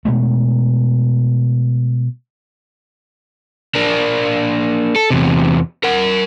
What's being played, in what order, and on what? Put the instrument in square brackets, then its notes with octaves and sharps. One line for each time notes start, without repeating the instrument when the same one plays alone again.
[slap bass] B2 G#3 A3
[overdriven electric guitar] A#3 D4
A4
E2 C3
A#4 F#5